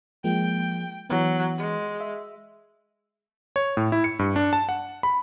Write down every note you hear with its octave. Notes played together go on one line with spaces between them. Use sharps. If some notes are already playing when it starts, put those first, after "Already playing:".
F3 G#3 A#3 G5
E3 F#3 B3
G#3
E5
C#5
A2
E4
C#7
G2
D4
A5
F#5
B5